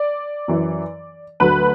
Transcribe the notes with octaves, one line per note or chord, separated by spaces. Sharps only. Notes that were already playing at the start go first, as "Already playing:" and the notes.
Already playing: D5
F#2 E3
D2 D3 F#3 B4